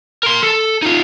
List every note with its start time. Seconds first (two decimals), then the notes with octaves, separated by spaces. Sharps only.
0.23 A#4 C6
0.43 A4
0.82 D#4 F4